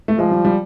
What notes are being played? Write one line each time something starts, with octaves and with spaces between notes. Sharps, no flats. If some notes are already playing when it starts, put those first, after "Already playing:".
A3
F3 G#3
G3
G3